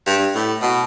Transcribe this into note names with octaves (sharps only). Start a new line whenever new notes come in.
G2
A2
B2